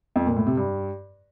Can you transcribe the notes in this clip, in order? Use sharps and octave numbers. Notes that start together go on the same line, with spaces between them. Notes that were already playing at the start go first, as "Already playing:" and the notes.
F2
A#2
A2
C3
G2